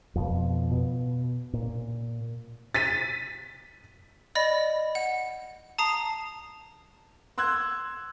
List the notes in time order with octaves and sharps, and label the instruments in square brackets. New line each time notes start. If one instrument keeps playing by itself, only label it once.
[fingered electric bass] F2 B2
B2
A#2
[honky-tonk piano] A6 B6 D#7
[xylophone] D5 D#5 B5 A#6
F#5
A5 A#5 D#6 C7
[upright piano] C6 E6 F#6 G#6